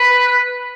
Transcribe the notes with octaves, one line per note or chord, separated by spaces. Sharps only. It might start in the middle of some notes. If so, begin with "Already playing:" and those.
Already playing: B4